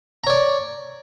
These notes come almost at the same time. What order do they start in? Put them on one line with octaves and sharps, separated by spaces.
A#5 C#5 D5